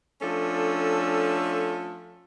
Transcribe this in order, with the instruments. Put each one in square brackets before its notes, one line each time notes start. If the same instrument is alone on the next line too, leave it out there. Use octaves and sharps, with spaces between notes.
[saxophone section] F3 A3 C#4 D4 A4